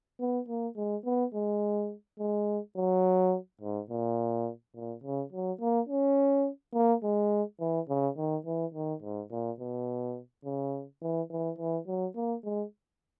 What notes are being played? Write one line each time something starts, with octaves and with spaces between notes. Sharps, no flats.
B3
A#3
G#3
B3
G#3
G#3
F#3
G#2
A#2
A#2
C#3
F#3
A#3
C#4
A#3
G#3
E3
C#3
D#3
E3
D#3
G#2
A#2
B2
C#3
E3
E3
E3
F#3
A#3
G#3